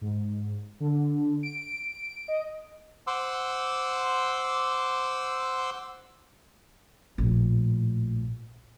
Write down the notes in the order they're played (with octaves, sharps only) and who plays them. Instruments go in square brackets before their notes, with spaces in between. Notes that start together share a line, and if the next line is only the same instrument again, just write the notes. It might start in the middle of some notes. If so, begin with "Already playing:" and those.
[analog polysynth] G#2
D3
D7
D#5
[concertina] C5 F#5 C6 D6 E6
[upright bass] A#1 A2